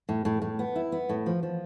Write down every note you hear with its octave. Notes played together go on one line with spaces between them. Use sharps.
A2
A2
A2
B3
E4
B3
A2
F3
F3